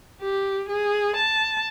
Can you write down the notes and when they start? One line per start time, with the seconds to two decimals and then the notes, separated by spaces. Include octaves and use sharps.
0.22 G4
0.69 G#4
1.16 A5